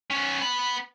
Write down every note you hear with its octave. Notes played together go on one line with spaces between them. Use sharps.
B3 C#4
B3 B5